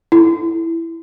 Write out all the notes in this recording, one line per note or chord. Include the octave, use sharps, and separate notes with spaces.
E4